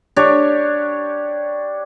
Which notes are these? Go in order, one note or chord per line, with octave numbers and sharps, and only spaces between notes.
D4 G4 C#5